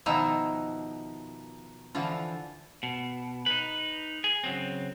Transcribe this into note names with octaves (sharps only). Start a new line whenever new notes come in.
B2 D#3 F3 D#4 E4
D3 E3 F3 F4
B2
D#4 B4
G#4
C#3 F#3 C4